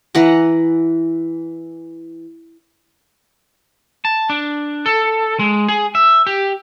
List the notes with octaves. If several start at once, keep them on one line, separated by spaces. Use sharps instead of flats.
E3 F#5 A#5
A5
D4
A4
G#3
G#4
E5
G4